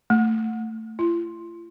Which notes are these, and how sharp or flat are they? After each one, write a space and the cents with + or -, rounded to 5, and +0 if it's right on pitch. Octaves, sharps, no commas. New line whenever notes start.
A3 +20
F4 -45